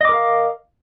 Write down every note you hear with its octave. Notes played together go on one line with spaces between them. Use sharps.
A#4 D#5 F5 D6